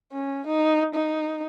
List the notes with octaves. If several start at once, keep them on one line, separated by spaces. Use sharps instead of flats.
C#4
D#4
D#4